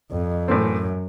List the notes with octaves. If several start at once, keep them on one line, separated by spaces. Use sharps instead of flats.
F2
F#2 A2 E3 A3 C4